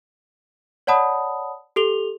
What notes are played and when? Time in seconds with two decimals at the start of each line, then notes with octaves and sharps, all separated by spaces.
0.87 C#5 D5 F#5 A5 B5 D#6
1.76 G4 A4 F7 G7